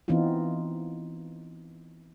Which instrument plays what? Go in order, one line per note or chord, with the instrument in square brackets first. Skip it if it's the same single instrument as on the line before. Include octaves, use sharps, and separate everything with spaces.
[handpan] E3 B3 C4 D#4 F4